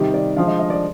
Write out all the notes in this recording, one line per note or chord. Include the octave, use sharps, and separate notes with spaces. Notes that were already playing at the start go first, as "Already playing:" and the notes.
Already playing: C3 D#3 G3 G4
D5
D3 F3 G#3 F5
D#5
D#5
D5